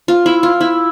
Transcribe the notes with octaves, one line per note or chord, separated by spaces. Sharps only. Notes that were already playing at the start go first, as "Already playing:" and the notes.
F4
E4
F4
E4